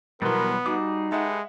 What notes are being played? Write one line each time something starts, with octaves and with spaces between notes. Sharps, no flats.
B2 E3 F#3 G3 B3 A#4 B4 C6
G3 D#4 F#4 G#4 D6
G#3 G4 A4 B4 E5 F#5